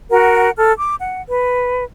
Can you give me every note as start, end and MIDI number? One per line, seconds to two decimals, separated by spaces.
0.11 0.49 66
0.11 0.49 70
0.11 0.49 78
0.56 0.72 69
0.56 0.72 89
0.77 0.95 86
0.99 1.20 78
1.28 1.85 71